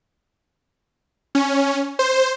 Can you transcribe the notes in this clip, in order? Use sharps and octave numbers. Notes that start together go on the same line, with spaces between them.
C#4
C5